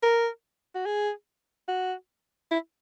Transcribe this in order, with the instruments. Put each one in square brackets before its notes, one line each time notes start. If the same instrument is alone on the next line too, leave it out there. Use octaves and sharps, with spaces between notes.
[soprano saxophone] A#4
F#4
G#4
F#4
E4